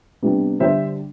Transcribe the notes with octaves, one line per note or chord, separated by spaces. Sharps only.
C3 G3 B3 D4
D3 G3 D4 C5 E5